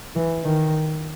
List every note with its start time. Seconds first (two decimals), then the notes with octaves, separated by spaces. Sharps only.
0.16 E3
0.44 D#3